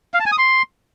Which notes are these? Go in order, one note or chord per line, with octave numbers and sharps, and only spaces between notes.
F5
A5
G#5
D#6
C6